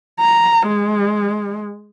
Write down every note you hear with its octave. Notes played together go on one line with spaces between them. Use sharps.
A#5
G#3